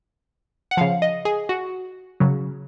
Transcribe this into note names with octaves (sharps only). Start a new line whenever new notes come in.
F#5
C#3 F3 F5
D#5
G#4
F#4
C#3 F#3